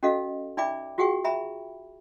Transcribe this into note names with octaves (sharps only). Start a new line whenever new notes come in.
C#4 F#4 A4 D#5 F5
D#4 D5 E5 G5 B5 D6
F4 F#4 G#4 F#5 G5 C#6
E5 G5 A#5 B5